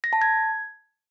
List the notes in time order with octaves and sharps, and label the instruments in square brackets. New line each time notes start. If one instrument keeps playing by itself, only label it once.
[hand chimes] A#6
A5
G#6